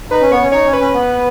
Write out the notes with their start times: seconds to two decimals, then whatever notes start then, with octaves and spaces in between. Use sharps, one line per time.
0.11 D#4 B4
0.22 C#4
0.32 B3 C#5
0.42 C#4
0.52 D#4 C#5
0.66 C#4
0.73 B4
0.80 C#4
0.94 B3